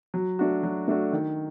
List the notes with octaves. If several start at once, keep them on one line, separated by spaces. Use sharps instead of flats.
F#3
A3 D4 F#4
F#3
A3 D4 F#4
D#3